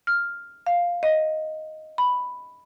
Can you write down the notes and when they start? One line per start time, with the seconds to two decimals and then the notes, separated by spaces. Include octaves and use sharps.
0.07 F6
0.67 F5
1.03 D#5
1.98 B5